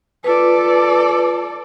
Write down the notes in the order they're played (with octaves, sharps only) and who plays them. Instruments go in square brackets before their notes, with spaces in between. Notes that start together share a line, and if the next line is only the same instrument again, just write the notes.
[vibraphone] F4 B4 [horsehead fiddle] A4 D5